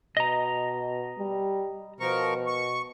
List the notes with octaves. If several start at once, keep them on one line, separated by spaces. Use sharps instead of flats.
B2 D#5 A#5
G3
B2 F3 A#4 C#6
C#6